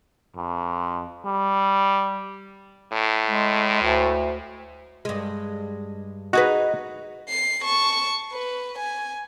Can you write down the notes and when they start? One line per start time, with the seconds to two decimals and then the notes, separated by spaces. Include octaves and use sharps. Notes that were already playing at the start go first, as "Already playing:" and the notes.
0.36 F2
1.25 G3
2.92 A2
3.26 G#3
3.82 D2
5.05 G2 G#3
6.33 D#4 F#4 G#4 B4
7.29 C7
7.64 A5 C#6
8.33 B4
8.78 G#5